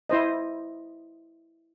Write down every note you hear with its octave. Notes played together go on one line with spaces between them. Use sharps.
E4 C5 D#5